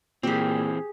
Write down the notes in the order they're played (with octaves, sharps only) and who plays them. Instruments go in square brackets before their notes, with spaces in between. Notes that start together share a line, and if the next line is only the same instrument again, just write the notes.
[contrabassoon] A#2 [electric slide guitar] E3 C4 [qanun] G4 G#4